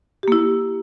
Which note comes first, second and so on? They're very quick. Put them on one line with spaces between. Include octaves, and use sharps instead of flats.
G4 A#3 E4